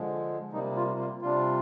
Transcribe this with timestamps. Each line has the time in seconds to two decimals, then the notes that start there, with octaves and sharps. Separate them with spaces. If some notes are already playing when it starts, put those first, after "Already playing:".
Already playing: D3 F3 G#3
0.53 C3 G3 A#3 D#4
0.76 F4
0.99 F4
1.22 C3 G3 D4 F4